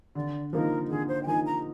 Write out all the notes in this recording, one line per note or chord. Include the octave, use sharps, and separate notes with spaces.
D3 D5
F3 A#3 D#4 A#4
D3 G#4
C5
G5
F3 A#3 D#4 G#5
A#5